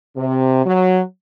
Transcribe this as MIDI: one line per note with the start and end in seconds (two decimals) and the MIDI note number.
0.17 0.62 48
0.66 1.00 54